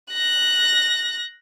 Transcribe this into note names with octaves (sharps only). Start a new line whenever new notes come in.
F#6 A#6